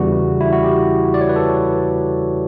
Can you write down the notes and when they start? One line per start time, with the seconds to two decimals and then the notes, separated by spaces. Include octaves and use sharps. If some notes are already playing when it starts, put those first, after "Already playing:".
Already playing: E2 C#3 E3 G3 F#4
0.41 E4
0.53 F#4
0.64 G4
1.14 D5
1.21 C#5
1.29 B4
1.36 A4